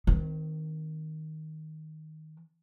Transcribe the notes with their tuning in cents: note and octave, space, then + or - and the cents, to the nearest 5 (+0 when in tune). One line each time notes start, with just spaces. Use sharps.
D#3 +5 C4 -30